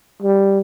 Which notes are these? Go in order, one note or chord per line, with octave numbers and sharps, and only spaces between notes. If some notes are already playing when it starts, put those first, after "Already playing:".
G3